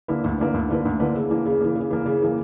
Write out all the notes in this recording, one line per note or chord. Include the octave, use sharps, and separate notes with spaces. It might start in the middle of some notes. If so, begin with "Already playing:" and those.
D3 A#3 E4 B4
D2
D3 A#3 E4 B4
D2
D3 A#3 E4 B4
D2
D3 A#3 E4 B4
C#3
E3 A#3
C#3
E3 A#3
C#3
E3 A#3
C#3
E3 A#3